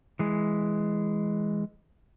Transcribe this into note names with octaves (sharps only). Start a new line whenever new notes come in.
E3 G#3